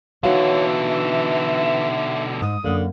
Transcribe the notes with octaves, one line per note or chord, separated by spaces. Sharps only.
B2 D3 E3 D#4 F#4 C#5 F5
E5
G#2 D#6
F#2 D3 A#3